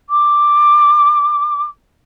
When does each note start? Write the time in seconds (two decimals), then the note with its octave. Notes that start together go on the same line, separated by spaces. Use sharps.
0.10 D6